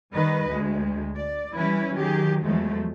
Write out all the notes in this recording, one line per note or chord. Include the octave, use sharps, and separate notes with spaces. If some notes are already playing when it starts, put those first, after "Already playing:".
D#3 G3 B4 D#5
D2 G#3
D5
E3 G3 C#4 E4 B4
D#3 F#3 G4 G#4
E2 F3 F#3 G#3 A3